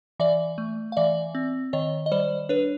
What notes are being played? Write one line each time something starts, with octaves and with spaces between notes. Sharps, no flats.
E3 D5 E5
A3
F5
E3 D5 E5
C4
D#3 C#5 D#5
D#5
G3 C5 D5
D4 B4 C#5